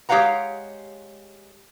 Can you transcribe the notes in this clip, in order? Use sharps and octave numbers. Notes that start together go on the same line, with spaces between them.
G#3 G4 C#5 F5 F#5 A#5